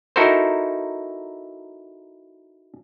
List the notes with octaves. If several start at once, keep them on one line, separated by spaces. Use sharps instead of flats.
D#4 E4 F#4 A4 A#4 C5